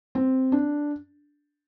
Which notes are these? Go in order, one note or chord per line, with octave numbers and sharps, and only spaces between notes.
C4
D4